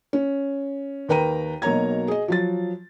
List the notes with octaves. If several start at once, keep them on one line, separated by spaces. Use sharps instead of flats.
C#4
D#2 A#4 B4 G5 A#5 D#7
B1 B2 A#3 C#5 A#5 G#6
G#4 D#5
F3 F#3 A6